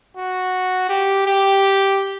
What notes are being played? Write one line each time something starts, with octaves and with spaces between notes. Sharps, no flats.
F#4
G4
G4